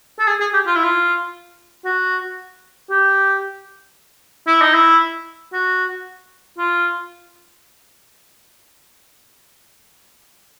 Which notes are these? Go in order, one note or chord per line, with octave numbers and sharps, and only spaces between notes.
A4
G#4
G#4
G4
F4
E4
F4
F#4
G4
E4
D#4
E4
F#4
F4